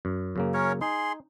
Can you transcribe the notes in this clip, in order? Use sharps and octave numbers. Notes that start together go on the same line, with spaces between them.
F#2
F#2 C#3 A#3
C#4 A#4 C#5
D#4 G#4 C6